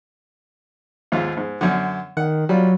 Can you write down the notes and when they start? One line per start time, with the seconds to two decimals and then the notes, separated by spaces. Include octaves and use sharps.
1.12 D#2 G#2 F4
1.37 G#2
1.61 F#2 D3
2.17 D#3 F#5
2.49 F#3 G3 F4